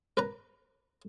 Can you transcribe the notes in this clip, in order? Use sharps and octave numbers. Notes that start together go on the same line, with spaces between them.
A#4 B4 A#5